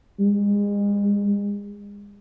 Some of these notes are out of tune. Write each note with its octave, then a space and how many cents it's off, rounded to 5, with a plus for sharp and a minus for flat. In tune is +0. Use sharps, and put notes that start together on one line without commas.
G#3 -35